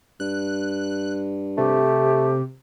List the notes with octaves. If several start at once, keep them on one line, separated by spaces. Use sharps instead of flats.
G2 F#6
C3 A3 G4